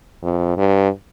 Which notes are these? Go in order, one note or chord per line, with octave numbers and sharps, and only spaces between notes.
F2
G2